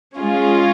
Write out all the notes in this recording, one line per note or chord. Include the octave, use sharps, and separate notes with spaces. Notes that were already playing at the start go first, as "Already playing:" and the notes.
G#3 C#4 F4 G#4